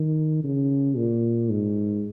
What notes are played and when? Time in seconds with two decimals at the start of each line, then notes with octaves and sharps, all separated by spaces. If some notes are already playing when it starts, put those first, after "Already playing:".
Already playing: D#3
0.44 C#3
0.96 A#2
1.50 G#2